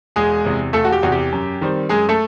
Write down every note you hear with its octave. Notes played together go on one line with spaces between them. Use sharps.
E1 G#3 G#4
E2 C3
E1 A3 A4
F#4
G4
E2 C3 F#4
G4
F#2
D#3 G3 C4
F#2 G#3 G#4
A3 A4